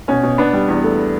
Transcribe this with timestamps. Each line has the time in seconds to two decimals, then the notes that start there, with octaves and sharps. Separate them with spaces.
0.08 B2 C#4
0.23 B2
0.38 B2 B3 D4
0.53 G3
0.68 E2
0.83 A3